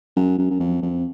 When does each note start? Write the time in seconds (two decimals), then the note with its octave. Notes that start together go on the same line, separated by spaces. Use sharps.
0.16 F#2
0.38 F#2
0.51 F#2
0.60 F2
0.82 F2